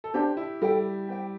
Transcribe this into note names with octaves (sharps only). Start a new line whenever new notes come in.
A4
D4 G4 C5 A5
E4
G3 A4 E5 G5
G4 C5 G5